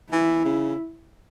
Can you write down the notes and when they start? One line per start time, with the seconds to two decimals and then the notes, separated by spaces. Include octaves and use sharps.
0.12 E3 E4
0.45 C#3